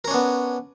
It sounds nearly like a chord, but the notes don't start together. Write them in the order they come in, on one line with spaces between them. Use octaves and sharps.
A#4 C#4 D4 B3